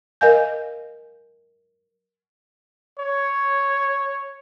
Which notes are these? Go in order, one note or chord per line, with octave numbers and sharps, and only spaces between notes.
A#4 D#5 F5 G#5 G6
C#5